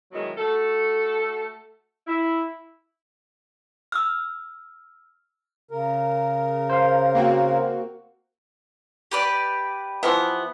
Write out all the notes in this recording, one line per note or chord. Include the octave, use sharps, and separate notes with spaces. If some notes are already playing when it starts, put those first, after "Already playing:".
B2 D#3 E3 F#3 G#3
A3 F#4 A4
E4
E6 F6
C#3 A#4
C5 F5
A#3 C4 F#4
G4 B4 D5
E3 F3 B3